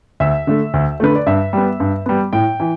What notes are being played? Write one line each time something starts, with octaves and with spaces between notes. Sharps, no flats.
D2 E5
D3 A3
D2
D3 A3 B4
D5
G2 E5
G3 B3
G2
G3 B3
A2 G5
E3